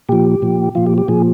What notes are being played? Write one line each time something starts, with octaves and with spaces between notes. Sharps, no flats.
A#2 F3 G4
A#2 F3
A#2 F3 F4
G4
G4
A#2 F3 G#4